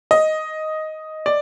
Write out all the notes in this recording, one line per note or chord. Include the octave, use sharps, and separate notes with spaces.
D#5
D5